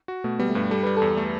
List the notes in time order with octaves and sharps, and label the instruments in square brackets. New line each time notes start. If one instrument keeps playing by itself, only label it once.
[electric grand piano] F#4
[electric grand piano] B2 [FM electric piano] A3
[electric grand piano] G3 [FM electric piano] B3
[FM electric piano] A3
[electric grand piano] G2 [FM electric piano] B3
[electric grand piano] G3 [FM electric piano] A4
[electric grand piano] G3 [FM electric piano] B4
[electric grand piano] E2 [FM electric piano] A4
[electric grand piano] A3